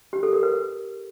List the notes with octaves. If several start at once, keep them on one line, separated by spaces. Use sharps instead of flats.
G4
A4
A#4
B4